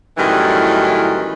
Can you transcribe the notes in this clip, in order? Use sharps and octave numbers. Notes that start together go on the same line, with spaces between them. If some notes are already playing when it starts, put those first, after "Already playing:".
F#2 A2 D#3 E3 G3